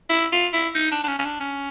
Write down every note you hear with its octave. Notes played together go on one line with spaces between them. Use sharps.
E4
F4
E4
D#4
D4
D4
C#4
C#4
D4
C#4